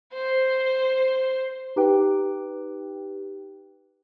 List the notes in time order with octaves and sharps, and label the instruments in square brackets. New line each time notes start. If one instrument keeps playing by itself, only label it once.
[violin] C5
[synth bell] D#4 G4 B4 G5